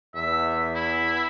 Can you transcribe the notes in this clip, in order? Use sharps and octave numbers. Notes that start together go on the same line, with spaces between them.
E2 E5
E4